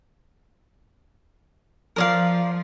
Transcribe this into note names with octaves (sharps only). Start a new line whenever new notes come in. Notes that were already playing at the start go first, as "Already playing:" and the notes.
F3 A#4 D5 F5